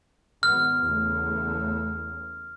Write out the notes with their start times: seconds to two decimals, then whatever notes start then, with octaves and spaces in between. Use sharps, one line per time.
0.43 G#1 B3 F6
0.83 E2 C#3 A3